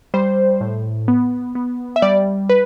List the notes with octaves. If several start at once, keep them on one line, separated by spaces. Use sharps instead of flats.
G3 C5
A2
B3
B3
E5
G3 D5
B4